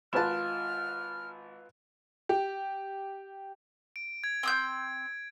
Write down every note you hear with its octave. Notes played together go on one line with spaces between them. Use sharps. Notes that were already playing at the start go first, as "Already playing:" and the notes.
G#1 F4 B4 A5 F6 E7
G4
D7
G#6
C4 D#6 G6